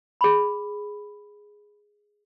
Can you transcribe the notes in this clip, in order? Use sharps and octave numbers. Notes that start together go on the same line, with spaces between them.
G#4 B5